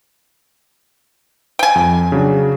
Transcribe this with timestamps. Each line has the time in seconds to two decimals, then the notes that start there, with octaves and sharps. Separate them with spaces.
1.59 G5 G#5
1.76 F2
2.12 C#3 F#3 D4